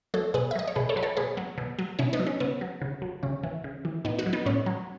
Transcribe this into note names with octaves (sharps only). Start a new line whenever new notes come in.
F#3 A4 C#5
B2 G#4 B4
E5
F#3 D#5
C#5
B2 G#4 B4
A4 C#5
F#3 B4
A4 C#5
B2 G#4 B4
F#3
B2
F#3
B2 C#4 E4
B3 D#4
F#3
C#4
C#3 B3
F#3
C#3
F#3
C#3 C#4
E3
C#3
E3
A2 B3 D#4
D#4 F#4
F#3
B3 D#4
A2 C#4
F#3